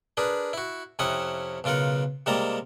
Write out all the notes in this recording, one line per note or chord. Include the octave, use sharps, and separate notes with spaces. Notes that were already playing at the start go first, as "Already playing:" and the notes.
D4 G#4 A#4 B4
E4 F#4
F2 C3 C#4 E4 F#5 D#6
B1 C#3 F4 A#4 F#5
C3 G3 G#3 A#3 A5 A#5